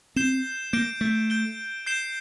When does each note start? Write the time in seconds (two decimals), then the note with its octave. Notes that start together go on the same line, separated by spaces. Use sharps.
0.16 C4 G6 C7 E7 G7
0.73 A#3 G6 D7 G7
1.01 A3
1.30 G6 D7 G7
1.86 G6 C7 E7 G7